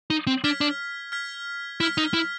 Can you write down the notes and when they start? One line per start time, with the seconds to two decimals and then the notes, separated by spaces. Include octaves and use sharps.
0.10 D#4
0.27 C4
0.44 D4 F6 G#6 B6
0.61 D4
1.12 F6 G#6 B6
1.80 E4 F6 G#6 B6
1.98 D#4
2.14 E4